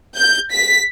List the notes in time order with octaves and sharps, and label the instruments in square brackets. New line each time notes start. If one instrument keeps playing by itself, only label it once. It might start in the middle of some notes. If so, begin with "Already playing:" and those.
[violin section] G6
B6